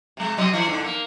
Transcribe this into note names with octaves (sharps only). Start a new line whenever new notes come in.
C3 G#3
C3 F#3 D#5
E3 C5
E2 G#2 D3
A#3